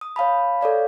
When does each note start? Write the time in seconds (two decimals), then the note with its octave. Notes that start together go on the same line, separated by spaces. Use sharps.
0.01 D#6
0.16 C#5 F5 A5 B5
0.61 A4 C#5 D5 F5